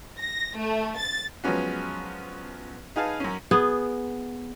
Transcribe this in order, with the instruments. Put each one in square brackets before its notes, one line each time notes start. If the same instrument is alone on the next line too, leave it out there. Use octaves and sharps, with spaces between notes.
[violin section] A#6
A3
A6
[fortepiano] F3 F#3 G#3 B3 C#4 F#4
D#4 G#4 B4 F5 G#5 A5
F#2 C#4
[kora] B3 G#4